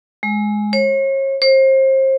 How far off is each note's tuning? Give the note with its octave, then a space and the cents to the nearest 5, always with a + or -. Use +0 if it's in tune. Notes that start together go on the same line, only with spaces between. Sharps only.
G#3 +10
C#5 -40
C5 +30